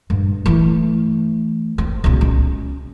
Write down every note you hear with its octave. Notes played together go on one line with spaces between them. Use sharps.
G2
E3 A3
C4
C#2 B2
C#4